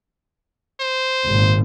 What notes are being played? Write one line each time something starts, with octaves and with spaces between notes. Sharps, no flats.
C5
G#1 A#2